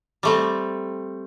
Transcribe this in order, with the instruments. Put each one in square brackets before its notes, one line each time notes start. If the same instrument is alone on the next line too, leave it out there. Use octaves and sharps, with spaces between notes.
[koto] G3 A3 C4